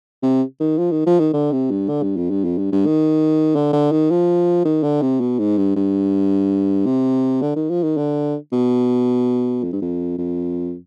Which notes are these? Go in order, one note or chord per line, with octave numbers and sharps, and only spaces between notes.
C3
D#3
F3
D#3
F3
D#3
D3
C3
G2
D3
G2
F2
G2
F2
G2
G2
D#3
D3
D3
D#3
F3
D#3
D3
C3
B2
G#2
G2
G2
C3
D3
D#3
F3
D#3
D3
B2
F2
G2
F2
F2